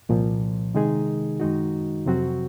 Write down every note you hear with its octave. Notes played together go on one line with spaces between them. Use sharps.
C2 A#2 F3
C3 D#3 G#3 D#4 G#4
F#2 D#3 G#3 D#4 F#4
F2 C3 F#3 C4 F#4